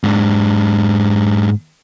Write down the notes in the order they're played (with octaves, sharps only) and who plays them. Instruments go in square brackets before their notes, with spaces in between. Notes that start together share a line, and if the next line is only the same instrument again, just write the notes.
[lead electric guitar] G#2 D4